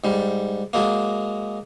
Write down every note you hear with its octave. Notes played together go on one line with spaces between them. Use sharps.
G#2 G3
F#3 G#3 A#3